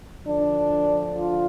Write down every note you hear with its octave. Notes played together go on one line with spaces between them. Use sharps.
D2 D3 F3 D4
F4